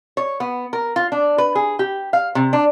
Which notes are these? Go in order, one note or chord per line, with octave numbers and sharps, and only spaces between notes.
C#5
B3
A#4
F4
D4
B4
G#4
G4
F5
C3
D4